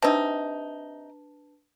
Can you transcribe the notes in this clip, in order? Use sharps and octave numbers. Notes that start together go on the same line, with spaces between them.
C3 D4 D#4 B4 A5